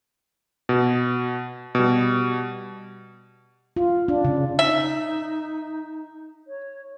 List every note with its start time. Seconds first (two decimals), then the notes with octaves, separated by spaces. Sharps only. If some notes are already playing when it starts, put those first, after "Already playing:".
0.69 B2
1.75 B2 G3
3.76 F4
4.08 D4
4.25 C#3
4.59 D#4 E5
6.47 C#5